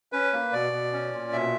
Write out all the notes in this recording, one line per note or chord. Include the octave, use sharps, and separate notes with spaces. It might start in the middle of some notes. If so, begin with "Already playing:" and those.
C#4 B4
A#3
B2 D5
B2
C#4
A#2
B2 E5